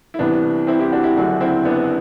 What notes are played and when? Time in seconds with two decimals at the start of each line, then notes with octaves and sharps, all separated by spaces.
0.14 E4
0.19 C2 C3 E3 B3 D4
0.67 C4 E4
0.79 E4 G4
0.92 D4 F#4
1.04 E4 G4
1.16 F#1 F#2 D3 D4 F#4
1.40 C4 E4
1.65 B3 D4